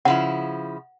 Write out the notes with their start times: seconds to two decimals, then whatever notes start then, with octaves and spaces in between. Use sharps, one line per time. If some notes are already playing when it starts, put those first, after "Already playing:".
0.05 C#3 F3 E4 F#5